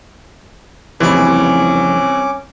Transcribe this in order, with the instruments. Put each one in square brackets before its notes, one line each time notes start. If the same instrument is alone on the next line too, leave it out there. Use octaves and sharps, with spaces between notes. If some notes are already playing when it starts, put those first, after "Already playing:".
[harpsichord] C2 E4 [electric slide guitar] F2 C#3 [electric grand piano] E3 [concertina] C#4 D6